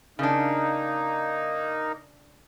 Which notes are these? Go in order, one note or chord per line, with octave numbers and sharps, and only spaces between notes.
C#3 A#3 D4 D#4